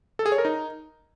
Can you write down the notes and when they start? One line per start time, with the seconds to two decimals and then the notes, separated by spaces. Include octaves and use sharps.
0.19 A4
0.26 G#4
0.32 C#5
0.38 A#4
0.45 D#4